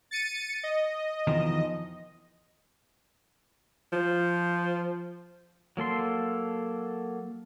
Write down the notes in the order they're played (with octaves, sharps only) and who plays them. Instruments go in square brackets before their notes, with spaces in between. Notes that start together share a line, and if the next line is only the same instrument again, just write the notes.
[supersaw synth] A6 C#7 D#7
D#5
[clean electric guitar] E2 D#3 F3
[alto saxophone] F3
[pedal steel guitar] F#3 A#3 A4 C6